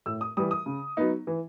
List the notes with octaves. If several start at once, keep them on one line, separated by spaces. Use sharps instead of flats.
A2 E6
D#6
E3 G3 D#6
D#6
C#3
F#3 B3 D#4
E3